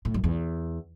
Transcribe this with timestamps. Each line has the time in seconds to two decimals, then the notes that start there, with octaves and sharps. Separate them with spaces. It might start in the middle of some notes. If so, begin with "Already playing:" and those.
0.05 A2
0.14 F#2
0.24 E2